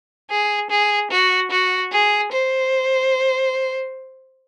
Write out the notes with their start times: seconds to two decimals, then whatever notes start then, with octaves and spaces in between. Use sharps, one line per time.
0.30 G#4
0.71 G#4
1.11 F#4
1.51 F#4
1.92 G#4
2.32 C5